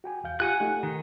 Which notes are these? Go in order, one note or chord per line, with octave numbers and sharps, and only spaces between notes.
F#4 G5 G#5
E2 F5 G6
F4 G4 F#5 G#5 F#6
A3 D#4 G4
D#3